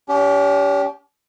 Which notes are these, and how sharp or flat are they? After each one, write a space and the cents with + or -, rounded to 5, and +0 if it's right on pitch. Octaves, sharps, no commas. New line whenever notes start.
C#4 +45 G4 +0